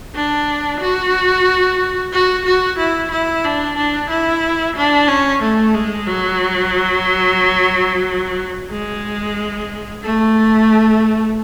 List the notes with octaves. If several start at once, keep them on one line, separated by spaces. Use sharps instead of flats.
D4
F#4
F#4
F#4
E4
E4
D4
D4
E4
D4
C#4
A3
G#3
F#3
G#3
A3